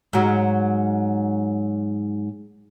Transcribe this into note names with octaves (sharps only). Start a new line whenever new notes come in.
G#2 F#3